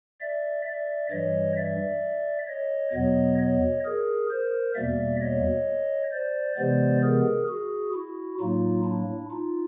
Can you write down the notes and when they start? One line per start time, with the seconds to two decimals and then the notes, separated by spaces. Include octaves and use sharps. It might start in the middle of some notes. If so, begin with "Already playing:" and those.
0.21 D5 E5
0.66 D5 E5
1.11 G2 E3 G3 C#5 D#5
1.57 D5 E5
2.48 C#5 D#5
2.93 E2 B2 F#3 B3 C#5 D#5
3.39 C#5 D#5
3.85 G#4 A#4
4.31 A#4 C5
4.75 E2 B2 G3 A#3 D5 E5
5.21 C#5 D#5
6.12 C5 D5
6.57 C3 E3 G#3 B3 C5 D5
7.03 G#4 A#4
7.48 F#4 G#4
7.94 E4 F#4
8.39 A2 F#3 A#3 D#4 F4
8.85 D4 E4
9.31 D#4 F4